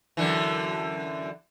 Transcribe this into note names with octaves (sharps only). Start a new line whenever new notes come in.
F#2 D3 E3